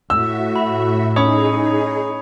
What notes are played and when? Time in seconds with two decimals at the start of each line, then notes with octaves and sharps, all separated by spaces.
0.10 A2 F#4 E5 E6
0.56 B5
1.16 C#4 D#4 G#4 C#5 B5 D#6